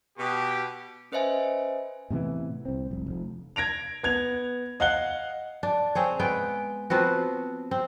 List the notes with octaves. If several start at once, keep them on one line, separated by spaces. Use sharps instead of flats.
B2 G4
C#4 B4 C5 D#5 E5 G#5
A2 C3 E3 B3
C2 C4
F1 C2
F1 F2
G#6 A#6 D7 F7
B3 G#6 F7
D#5 F5 F#5 F#6 G7
D4
C4 G#4 C#5
G#3 B3 G5
F3 B3 C4 F#4
C4